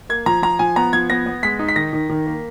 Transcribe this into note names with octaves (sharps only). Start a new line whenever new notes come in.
A#3 G#6
F3 A#5
F3 A#5
F3 G#5
B3 A#5
F3 G#6
B3 A#6
B3
G#3 B6
D#4
B6
D#3 A#6
D#3
D#3
A#3